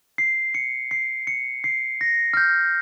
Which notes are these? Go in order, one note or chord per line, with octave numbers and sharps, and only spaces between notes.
C7
C#7
C7
C#7
C7
A#6
F6
G6